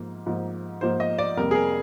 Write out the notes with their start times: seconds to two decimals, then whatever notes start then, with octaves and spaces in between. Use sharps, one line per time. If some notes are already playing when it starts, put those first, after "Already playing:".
Already playing: G#2 F3 A#3
0.26 G#2 F3 A#3
0.81 G#2 F3 A#3 C5
1.00 D#5
1.18 D5
1.37 F2 C3 G3 A#3 A#4
1.51 G#4
1.55 A#4